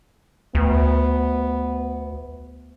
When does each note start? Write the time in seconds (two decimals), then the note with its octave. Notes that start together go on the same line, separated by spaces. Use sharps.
0.55 D2 B3